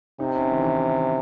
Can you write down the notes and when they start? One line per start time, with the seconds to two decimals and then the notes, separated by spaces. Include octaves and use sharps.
0.20 C3 D#4
0.36 C#4
0.52 D#3
0.59 E3
0.66 D#3